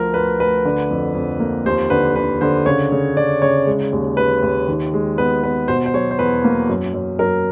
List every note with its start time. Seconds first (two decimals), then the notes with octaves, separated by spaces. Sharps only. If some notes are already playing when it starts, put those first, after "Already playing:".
Already playing: D2 F3 A#4
0.14 D2 B4
0.39 D2 B4
0.65 D3
0.90 F2
1.15 F2
1.40 A#3
1.66 D#2 C5
1.90 D3 B4
2.16 D3 B4
2.41 D3 C5
2.66 C#3 C#5
2.92 C#3
3.16 C#3 D5
3.42 C#3 C#5
3.67 G#3
3.93 D#2
4.17 D#2 B4
4.42 D#2
4.68 D#3
4.94 G#3
5.18 B3 B4
5.43 B3 B4
5.68 B2 C5
5.86 C5
5.94 F#3 C#5
6.11 C5
6.19 E2 B4
6.44 A#3
6.69 F#2
6.94 F#2
7.19 F#2 A#4